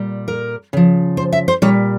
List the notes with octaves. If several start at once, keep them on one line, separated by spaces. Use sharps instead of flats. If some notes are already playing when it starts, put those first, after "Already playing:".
Already playing: A#2 G3
A#4
C#3 F3
C5
E5
C5
A#2 G3 C#5